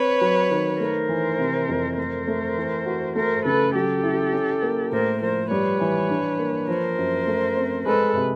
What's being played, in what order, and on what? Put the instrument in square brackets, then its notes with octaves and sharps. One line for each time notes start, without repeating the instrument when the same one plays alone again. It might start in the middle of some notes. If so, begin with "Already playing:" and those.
Already playing: [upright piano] C4 [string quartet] B4 C#5
[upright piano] F#3
D#3
[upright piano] A3 [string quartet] A#4 C5
[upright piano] E3
C3
F2
[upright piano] A3 [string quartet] A#4 C5
[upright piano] A3
E3
F#4
[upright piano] A3 [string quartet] A#4 C5
[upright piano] C#3 [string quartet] A4 B4
[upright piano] F#3 [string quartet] G4 A4
[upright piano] E4
C#4
A#3
[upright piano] A2 [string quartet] A#4 C5
[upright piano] F3 [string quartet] A#4 C5
[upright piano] G3 [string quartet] B4 C#5
[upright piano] E3
D4
A#3
[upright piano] F3 [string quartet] A#4 C5
[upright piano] F#2
A3
C4
[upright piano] G#3 [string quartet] A4 B4
[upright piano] C3